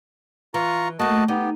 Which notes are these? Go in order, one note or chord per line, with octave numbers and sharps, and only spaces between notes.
E3 F4 A#5 C#6
A3 A#3 F#4 D#5 A5
B3 D#4 G4